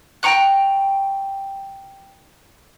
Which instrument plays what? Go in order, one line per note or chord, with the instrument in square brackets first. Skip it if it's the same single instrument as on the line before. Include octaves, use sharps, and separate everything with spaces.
[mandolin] G5 A#5 C#6 F#6